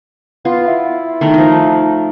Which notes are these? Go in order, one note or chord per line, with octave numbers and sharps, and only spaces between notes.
B3 F4
E4
D#3 A3 A#4
F3 D#4